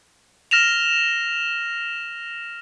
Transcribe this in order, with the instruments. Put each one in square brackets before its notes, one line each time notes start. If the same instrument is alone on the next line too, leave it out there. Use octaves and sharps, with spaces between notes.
[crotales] F6 A#6 E7 F7